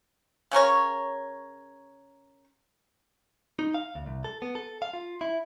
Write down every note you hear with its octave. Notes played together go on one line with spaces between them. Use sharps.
C#3 C#4 A#4 C#5
D#4
F5
D2
C2
A4
B3
A4
F5
F4
E4